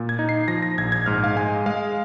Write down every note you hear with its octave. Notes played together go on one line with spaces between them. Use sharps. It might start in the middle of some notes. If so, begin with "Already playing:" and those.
Already playing: A#2
G#6
D#4
C7
F3 A#6
A#6
A#1 G#6
G#6
G#2 F6
F5
G#3 G#5
G#3 F5